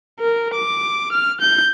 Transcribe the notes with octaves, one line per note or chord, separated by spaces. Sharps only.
A#4
D6
F6
G6